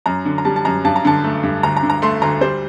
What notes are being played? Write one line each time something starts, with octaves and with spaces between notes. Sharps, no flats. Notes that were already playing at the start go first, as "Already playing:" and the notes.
F#2 A#5
D3
A#5
G3 A5
A5
F#2 A#5
G2 A5
A#5
D3 A5
A3
G2
D2 A#5
A#5
D3
A#5
A3 C6
D2 A#5
G3 C5